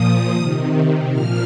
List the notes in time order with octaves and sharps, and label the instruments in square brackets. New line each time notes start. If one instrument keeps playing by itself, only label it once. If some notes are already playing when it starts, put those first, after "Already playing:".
Already playing: [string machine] A#2 F3 D#6
C3 D#3
A#2 F3 F6